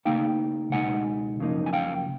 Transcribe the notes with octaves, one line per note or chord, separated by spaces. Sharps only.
C#3 F#3 A#3 D#4 F5 G5
C#2 B2 G#3 D#4 F#5 G#5
F#2 C#3 F3 A#3 D#4
G#5
F5 G5